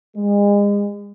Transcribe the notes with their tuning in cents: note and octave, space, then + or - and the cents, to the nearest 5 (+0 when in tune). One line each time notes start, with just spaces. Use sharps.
G#3 -35